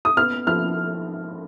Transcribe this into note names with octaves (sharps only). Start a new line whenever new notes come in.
D#6
B3 F6
F3 F6